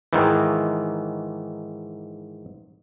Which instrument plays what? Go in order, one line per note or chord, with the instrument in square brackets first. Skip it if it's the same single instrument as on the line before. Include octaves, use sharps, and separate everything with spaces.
[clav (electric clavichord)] G#2 D#3 E3